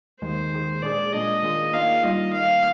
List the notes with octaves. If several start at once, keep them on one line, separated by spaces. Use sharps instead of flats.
D#2 D#3 G#3 C5
D#2 D#3 G#3
A#2 G#3 D4 G#4 D5
A#2 G#3 D4 G#4 D#5
D#3 A#3 D4 F4 G#4
D#3 A#3 D4 F4 G#4 F5
D#3 G3 A#3 F4 D#5
D#3 G3 A#3 F4 F5